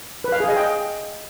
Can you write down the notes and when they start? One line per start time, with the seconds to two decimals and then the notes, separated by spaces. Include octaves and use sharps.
0.24 B4
0.32 F5
0.40 G#4
0.48 D#5
0.56 G5